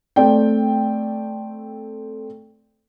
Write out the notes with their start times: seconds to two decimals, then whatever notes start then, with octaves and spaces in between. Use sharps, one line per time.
0.16 A3 C4 D5 G5